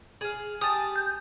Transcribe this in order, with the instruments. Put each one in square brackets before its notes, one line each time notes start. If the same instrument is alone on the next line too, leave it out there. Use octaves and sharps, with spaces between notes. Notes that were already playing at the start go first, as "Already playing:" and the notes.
[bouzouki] G#4 F5
[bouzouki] G4 A5 [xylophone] G#5 D#6
[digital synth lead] G6